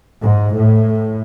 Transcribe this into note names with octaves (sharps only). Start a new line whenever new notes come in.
G#2
A2